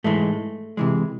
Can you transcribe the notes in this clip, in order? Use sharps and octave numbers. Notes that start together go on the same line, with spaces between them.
G#2 E3 G#3 A3
C3 E3 G#3